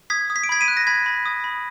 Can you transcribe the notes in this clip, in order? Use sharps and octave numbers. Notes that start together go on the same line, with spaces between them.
D#6 G#6 B6
D#6
B6
D7
B5 G#6 B6
B6 D#7
F#6
A#6
B5 G#6 B6
B5
D#6
B5